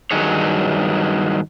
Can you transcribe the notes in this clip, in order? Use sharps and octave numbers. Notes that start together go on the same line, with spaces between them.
G2 D#3 F#3 G#4 C#5